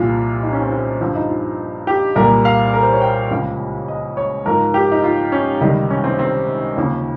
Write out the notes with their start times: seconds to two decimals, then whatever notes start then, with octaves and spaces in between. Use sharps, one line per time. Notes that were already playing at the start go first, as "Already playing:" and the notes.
Already playing: C2 A#2 F3 F4
0.43 D#4
0.52 C#4
0.62 C4
0.72 C4
1.01 G2 F3 C4
1.15 D#4
1.30 F4
1.87 G4
2.16 C2 A#2 G3 A#4
2.45 F5
2.74 A#4
2.83 C5
2.93 C#5
3.01 G5
3.30 C#2 C#3 F3
3.88 D#5
4.17 C#5
4.46 G#2 F3 A#4
4.74 G4
4.92 D#4
5.04 F4
5.32 C#4
5.61 C#2 C3 D#3 G3 D#4
5.90 C#4
6.04 C4
6.19 C4
6.76 D#2 C#3 F3